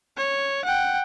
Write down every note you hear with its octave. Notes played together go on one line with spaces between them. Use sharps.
C#5
F#5 G5